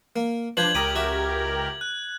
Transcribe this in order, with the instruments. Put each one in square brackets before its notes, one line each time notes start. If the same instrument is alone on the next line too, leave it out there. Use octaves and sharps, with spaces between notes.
[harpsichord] A#3
[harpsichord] F3 B4 C5 [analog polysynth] D4 [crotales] G6 G#6 F#7
[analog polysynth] C#2 G4 A#4 [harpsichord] D6 D#6
[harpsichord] F#4 E5
[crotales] F#6